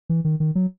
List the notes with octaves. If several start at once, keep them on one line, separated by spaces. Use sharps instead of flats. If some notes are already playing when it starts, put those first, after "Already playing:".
E3
D#3
D#3
F#3